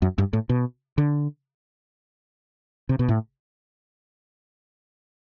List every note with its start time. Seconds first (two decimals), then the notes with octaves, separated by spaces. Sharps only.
0.02 F#2
0.18 G2
0.33 A2
0.49 B2
0.98 D3
2.89 C3
2.99 B2
3.09 A2